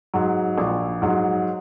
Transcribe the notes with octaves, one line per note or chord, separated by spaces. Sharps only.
G#2 F#3
A#1
G#2 F#3